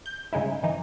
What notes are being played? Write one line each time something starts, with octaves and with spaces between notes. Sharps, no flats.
G6
G2 C#3 G#3 D#4 E4
F#2 E3 D#4